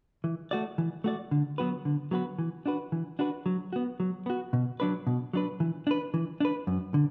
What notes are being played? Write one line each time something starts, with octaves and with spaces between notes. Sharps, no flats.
E3
A3 F#4 D5
E3
A3 F#4 D5
D3
F#3 B3 F#4 B4
D3
F#3 B3 F#4 B4
E3
D4 F#4 B4
E3
D4 F#4 B4
F#3
B3 F#4
F#3
B3 F#4
B2
F#3 D4 B4
B2
F#3 D4 B4
E3
D4 B4
E3
D4 B4
F#2
D3